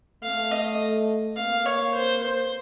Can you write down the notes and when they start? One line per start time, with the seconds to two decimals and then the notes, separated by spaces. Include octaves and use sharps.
0.23 A3 F5
0.51 D#5
1.37 A#3 F5
1.66 C#5
1.94 C5
2.23 C5